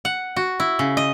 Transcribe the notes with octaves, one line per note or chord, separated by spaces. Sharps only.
F#5
F#4
E4
C#3
D#5